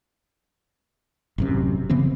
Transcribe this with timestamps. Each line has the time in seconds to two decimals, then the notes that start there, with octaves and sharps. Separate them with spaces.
1.38 A1 F#2 C3
1.90 C#3 E3 B3 C4